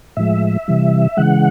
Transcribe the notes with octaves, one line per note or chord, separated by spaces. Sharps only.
A2 F3 G#3 E5
C3 E3 G3
C#3 E3 G#3 F#5